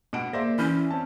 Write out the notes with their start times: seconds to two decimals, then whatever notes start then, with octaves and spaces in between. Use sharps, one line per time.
0.13 B2 F#5 D7
0.33 A#3 G#4 C5 D5 E5 C6 A#6
0.59 E3 C#4 B5 F6 G6
0.91 C4 C#4 A5